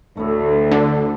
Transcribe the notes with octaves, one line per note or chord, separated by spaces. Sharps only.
D2 A2 A3
D3 A4